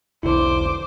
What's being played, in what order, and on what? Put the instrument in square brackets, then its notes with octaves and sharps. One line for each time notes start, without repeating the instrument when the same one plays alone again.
[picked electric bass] E1 B1 D3 [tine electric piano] E4 [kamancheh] C5 D6